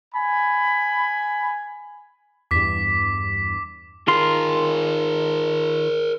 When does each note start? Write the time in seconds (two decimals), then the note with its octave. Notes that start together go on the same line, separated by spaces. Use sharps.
0.15 G#5 B5
2.51 E2 G2 D6 B6
4.08 D#3 F4 G#4 A#4 C6